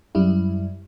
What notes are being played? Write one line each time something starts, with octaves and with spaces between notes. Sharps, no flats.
F#2 G3 E4